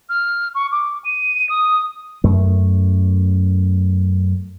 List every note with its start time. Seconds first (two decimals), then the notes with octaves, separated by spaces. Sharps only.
0.09 F6
0.55 C#6
0.72 D6
1.04 D#7
1.49 D#6
2.24 F#2 A3